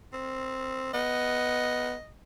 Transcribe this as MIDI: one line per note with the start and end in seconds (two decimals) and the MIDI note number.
0.13 0.93 60
0.94 1.94 59
0.94 2.10 75